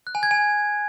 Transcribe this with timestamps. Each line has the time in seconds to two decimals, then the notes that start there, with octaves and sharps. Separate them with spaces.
0.07 F#6
0.15 G#5
0.23 G#6
0.31 G#5